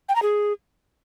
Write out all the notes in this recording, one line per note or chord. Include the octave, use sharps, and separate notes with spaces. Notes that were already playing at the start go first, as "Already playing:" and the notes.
G5
A#5
G#4